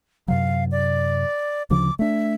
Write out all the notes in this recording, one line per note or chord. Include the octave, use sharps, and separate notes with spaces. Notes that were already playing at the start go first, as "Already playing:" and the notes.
F#2 C3 F#3 F5
D5
D2 C#3 F3 D6
A3 D4 E5